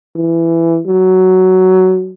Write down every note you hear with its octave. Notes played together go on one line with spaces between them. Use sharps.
E3
F#3